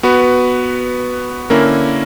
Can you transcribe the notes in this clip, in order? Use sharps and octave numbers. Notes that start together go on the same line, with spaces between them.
B3 F#4 B4
D3 A#3 C#4 E4 A#4